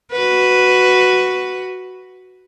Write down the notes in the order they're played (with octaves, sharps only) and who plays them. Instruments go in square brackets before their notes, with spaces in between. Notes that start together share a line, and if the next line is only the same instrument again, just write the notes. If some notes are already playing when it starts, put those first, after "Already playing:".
[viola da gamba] F#4 B4